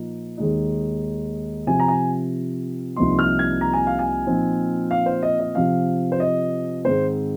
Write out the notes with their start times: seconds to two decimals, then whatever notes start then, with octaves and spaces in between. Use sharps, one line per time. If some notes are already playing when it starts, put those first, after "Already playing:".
Already playing: A#2 F3 A#3 D#4
0.38 D#2 D#3 G#3 D#4
1.67 C3 F3 C4 G#5
1.80 A#5
1.88 G#5
2.96 C2 C3 F3 A#3 D#4 C6
3.19 F6
3.39 G#6
3.61 A#5
3.73 G#5
3.87 F5
3.99 G#5
4.26 A#2 F3 C4 D#4
4.91 F5
5.06 C5
5.23 D#5
5.40 D#5
5.55 C3 F3 C4 F5
6.12 C5
6.20 D#5
6.85 G#2 D#3 G#3 C4 C5